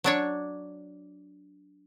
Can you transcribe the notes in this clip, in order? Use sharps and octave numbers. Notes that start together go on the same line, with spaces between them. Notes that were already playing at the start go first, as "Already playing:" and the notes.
F#3 D4 C#5